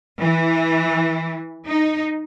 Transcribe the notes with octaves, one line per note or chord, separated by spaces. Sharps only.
E3
D#4